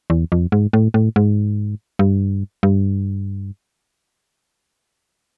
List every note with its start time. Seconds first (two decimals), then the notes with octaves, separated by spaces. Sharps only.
0.10 E2
0.32 F2
0.52 G#2
0.73 A2
0.94 A2
1.16 G#2
1.99 G2
2.63 G2